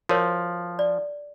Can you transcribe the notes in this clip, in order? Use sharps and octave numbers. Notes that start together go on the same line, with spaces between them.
F3 F#4 A#4 C#5
D5